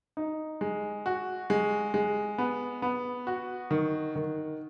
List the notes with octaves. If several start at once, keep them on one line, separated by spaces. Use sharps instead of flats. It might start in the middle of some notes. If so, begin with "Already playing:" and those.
D#4
G#3
F#4
G#3
G#3
B3
B3
F#4
D#3
D#3